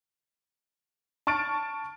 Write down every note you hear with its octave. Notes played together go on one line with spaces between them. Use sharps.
A5 C#6 F6 A6 D7